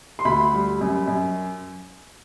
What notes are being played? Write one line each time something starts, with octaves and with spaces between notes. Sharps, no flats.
C6
D2 B5
G3
F#2
F#2